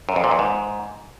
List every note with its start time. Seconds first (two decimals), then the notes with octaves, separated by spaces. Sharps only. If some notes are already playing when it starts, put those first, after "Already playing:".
0.09 F#2
0.16 F2
0.24 A#2
0.31 E2
0.39 G#2